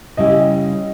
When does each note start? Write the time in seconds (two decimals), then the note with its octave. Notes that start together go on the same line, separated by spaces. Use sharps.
0.17 C#3 G3 C#4 E4 G4 D#5